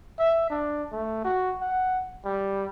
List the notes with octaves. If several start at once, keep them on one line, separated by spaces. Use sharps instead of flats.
E5
D4
A3
F#4
F#5
G3